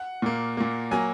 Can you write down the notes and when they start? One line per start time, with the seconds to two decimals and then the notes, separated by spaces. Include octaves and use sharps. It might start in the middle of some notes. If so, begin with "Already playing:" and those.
Already playing: F#5
0.22 A#2 A#3
0.57 A#2 A#3
0.91 F#3 A#3 G#5